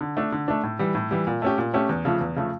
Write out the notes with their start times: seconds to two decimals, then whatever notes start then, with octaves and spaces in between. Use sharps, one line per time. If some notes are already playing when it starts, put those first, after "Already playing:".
0.01 D3
0.17 A3 D4
0.32 D3
0.48 A3 D4
0.63 A2
0.79 E3 G3
0.95 A2
1.11 E3 G3
1.27 A#2
1.42 A3 C#4 G4
1.58 A#2
1.74 A3 C#4 G4
1.89 E2
2.05 C#3 F3 A3
2.21 E2
2.36 C#3 F3 A3